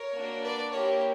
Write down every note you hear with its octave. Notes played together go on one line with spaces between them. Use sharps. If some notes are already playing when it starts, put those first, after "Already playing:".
Already playing: A#4 C#5
A#3 D4 F#4
B4 D5
A#3 E4 G4 A#4 C#5